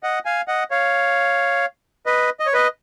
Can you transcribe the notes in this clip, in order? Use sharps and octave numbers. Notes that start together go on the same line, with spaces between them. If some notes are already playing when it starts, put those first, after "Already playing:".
D#5 F#5
F5 G#5
D#5 F#5
C#5 F5
B4 D#5
D#5
C#5
B4 D#5